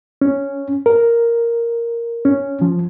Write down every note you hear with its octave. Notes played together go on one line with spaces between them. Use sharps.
C#4
A#4
C#4
F3